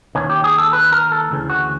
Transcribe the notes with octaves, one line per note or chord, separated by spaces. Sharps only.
D#2 D#3 C#4
G4
G#4
A4
B4
A#4
A4
D2 C#3 E3
F#4